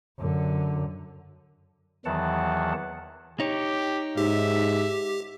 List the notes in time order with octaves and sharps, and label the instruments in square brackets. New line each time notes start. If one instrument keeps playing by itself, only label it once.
[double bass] F#2 D3
[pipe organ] E2 D#3 E3 F#3 F#5 A5
[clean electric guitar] D#4 C#5 [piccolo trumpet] G4
[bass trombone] G#2 [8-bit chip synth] G4 [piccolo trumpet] E5